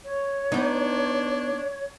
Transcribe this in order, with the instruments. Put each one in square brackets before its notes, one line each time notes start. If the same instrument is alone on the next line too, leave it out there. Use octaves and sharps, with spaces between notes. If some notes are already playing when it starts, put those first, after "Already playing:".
[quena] C#5
[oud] B3 D#4 [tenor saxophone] D4